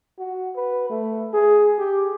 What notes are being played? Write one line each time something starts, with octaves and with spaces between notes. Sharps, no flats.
F#4
B4
A3
G#4
G4